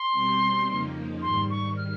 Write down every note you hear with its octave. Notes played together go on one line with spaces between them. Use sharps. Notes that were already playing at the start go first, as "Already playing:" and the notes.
Already playing: C6
B2 G3 C4
F2 C#3 F3 A#3 D#4
G#2 D#3 G3 C6
C#6
F6